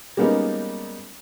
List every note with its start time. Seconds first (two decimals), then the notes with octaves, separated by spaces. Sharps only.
0.17 G3 G#3 A#3 B3 C#4 D#4